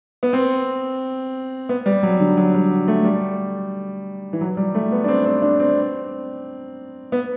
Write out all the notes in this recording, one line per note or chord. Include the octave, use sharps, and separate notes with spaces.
B3
C4
B3
G3
F#3
D3
F#3
G3
A3
G3
E3
F#3
G3
A3
B3
D4
C4
C4
D4
C4
B3